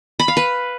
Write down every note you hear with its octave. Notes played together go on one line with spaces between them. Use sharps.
B5
F5
B4